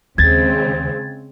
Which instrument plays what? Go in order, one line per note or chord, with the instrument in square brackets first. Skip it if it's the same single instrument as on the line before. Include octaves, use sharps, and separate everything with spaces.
[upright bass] D#2 [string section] C#3 G#3 C4 [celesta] G#6 A6